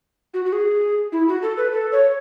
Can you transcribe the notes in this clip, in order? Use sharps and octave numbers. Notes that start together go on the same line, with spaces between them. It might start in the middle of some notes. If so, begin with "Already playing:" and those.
F#4
F#4
G#4
E4
F#4
A4
B4
A4
C#5